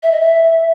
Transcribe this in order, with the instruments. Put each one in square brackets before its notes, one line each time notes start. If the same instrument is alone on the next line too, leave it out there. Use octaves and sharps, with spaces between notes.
[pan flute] E5
D#5
E5